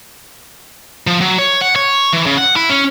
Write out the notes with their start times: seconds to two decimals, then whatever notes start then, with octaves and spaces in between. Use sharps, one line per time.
1.07 F3
1.21 F#3
1.39 C#5
1.61 F#5
1.76 C#5
2.13 E3
2.26 C#3
2.38 F#5
2.56 E4
2.70 C#4